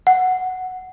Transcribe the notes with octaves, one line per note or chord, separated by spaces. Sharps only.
F#5